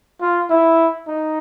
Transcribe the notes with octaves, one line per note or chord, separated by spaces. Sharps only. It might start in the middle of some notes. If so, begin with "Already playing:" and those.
F4
E4
D#4